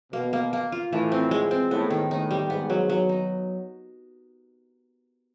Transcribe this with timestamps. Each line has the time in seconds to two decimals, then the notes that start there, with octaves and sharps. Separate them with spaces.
0.13 B2 A#3
0.33 A#3
0.53 A#3
0.72 F4
0.92 A2 E3
1.12 C4
1.31 G#3
1.51 C4
1.71 A2 B3
1.90 D#3
2.11 A2 D#4
2.31 G3
2.50 G#2 B3
2.70 F#3
2.90 F#3
3.09 D#4